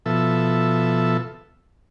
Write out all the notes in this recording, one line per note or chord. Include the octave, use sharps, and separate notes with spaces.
B2 F3 A4 E5